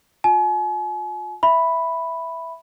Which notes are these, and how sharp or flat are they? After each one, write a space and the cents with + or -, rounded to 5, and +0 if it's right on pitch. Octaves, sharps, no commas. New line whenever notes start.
F4 +35 G#5 +40
E5 +0 B5 +0